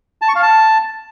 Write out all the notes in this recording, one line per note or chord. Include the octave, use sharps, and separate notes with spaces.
A5
C#6
F5
A5